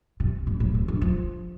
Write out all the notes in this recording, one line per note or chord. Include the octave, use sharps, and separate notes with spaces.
C3
A2
A2
C3
D3
F3